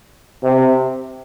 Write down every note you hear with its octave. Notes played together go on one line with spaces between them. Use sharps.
C3